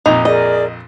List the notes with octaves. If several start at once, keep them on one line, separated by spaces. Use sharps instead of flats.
A#1 F2 D#4
G#4 A#4 D5 D#5